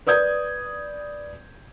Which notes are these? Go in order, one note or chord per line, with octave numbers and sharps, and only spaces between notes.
B4 D5 D#6 G6 G#6